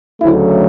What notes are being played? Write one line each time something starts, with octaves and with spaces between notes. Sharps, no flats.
D2 C#3 F#3 A3 E4